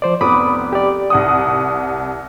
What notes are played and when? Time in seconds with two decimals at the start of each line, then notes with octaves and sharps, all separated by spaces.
0.02 F3 C5 D5
0.21 F1 B3 B5 D6 D#6
0.73 G4 D5
1.10 C2 F#5 D#6